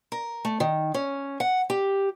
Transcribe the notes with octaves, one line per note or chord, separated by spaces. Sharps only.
A#4
A3
D#3
C#4
F#5
G4